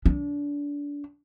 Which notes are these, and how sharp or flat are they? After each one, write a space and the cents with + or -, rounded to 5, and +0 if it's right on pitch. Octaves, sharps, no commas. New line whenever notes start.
D4 -25